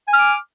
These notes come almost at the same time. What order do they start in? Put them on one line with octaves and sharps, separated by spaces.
G#5 F6 D6